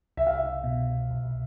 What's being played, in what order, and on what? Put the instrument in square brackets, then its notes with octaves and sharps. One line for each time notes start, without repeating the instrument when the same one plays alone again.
[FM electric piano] C2 [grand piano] E5
[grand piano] F5
E5
[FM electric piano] B2
C2